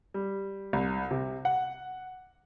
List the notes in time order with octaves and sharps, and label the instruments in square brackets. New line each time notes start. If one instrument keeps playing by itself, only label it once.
[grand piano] G3
C2
C3
F#5